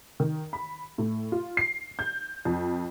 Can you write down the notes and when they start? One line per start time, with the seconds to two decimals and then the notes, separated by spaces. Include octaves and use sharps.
0.20 D#3
0.53 B5
0.98 A2
1.32 F4
1.57 C7
1.99 G6
2.45 F2